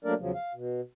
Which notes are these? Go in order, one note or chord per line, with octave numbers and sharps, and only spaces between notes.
F#3 A3 A#3 D4 A#4 D5
E2 C#3 F3 F#3
F5
B2